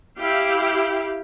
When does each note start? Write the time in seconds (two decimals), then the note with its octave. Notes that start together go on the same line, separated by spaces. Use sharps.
0.18 E4 G4 F5 G5